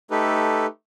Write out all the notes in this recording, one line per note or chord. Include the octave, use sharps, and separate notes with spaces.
A3 D#4 G4 A4 B4